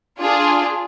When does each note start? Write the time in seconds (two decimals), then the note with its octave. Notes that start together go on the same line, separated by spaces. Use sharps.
0.20 D4 F4 G#4